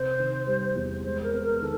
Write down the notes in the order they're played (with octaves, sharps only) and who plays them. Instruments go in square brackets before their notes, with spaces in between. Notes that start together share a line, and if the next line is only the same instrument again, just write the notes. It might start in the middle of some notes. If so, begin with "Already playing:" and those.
Already playing: [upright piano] C3 [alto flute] C5
[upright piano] D#3
G3
E2
[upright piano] G#3 [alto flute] C5
[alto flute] A#4
[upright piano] B3
[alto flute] A#4
[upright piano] D#3 [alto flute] A4